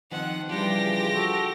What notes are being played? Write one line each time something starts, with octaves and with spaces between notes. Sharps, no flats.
D#3 F3 C4 F#5
C#3 E3 F3 G3 D4 F4 G4 A#6
F#4 A4